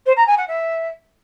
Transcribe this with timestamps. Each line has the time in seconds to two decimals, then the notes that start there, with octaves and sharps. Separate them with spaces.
0.06 C5
0.16 A#5
0.27 G#5
0.37 F#5
0.47 E5